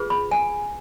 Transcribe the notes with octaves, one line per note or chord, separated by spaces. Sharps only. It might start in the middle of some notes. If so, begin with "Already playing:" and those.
Already playing: F4 G#4 B4
B5
G#5